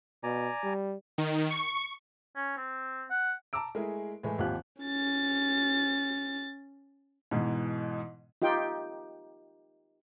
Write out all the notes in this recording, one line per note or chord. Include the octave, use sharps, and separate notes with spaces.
B2 D5 G#5 A#5
G3
D#3
C#6
C#4
C4
F#5
A5 A#5 D6 E6 D7
G#3 A3 E4 G#4 A#4
A2 E3 G#3 A3
G#1 D#2 F3 G4 F5 F#6
C#4 A6
G#2 B2 E3
D#4 F4 G4 G5